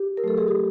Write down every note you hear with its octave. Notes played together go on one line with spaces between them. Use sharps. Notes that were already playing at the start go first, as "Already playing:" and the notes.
Already playing: G4
A#4
F#3 A3 A4
G#4
G4